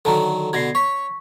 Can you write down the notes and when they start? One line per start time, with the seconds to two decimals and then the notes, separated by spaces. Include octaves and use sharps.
0.05 D3 D#3 F#3 A4 A5 A#5
0.53 B2 D3 G#6 A#6 C7
0.75 C#5 C#6 B6